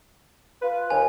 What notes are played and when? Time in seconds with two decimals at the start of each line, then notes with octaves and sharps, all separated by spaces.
0.62 F4 B4
0.90 D#2 G#5